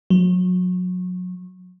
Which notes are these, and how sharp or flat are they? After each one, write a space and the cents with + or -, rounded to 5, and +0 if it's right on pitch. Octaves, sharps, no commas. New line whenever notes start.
F#3 -30